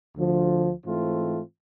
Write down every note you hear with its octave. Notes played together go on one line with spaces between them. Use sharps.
D2 D3 F3
G#2 E3 A3 C4 F4